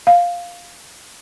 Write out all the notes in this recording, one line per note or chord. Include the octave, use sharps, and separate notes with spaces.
F5